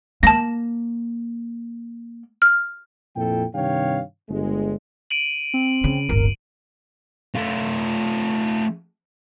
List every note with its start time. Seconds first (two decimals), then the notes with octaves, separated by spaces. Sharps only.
0.23 A#3 A5 A#6
2.42 F6
3.16 F2 A#2 F3 E4 A4 G5
3.54 G2 C3 D#3 C#5 F5 G5
4.29 G1 G#3
5.10 D7 D#7 F#7
5.54 C4
5.84 C#3
6.09 D1 G1 A#4
7.35 A3 F4